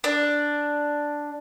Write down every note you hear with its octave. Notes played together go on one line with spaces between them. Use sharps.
D4